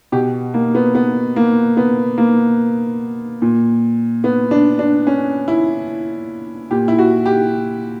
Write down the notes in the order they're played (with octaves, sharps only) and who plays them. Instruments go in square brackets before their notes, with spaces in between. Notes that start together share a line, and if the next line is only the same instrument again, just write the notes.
[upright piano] B2 G4
A#3
B3
B3
A#3
B3
A#3
A#2
B3
D4
D4
C#4
E4
A#2 G4
E4
F#4
G4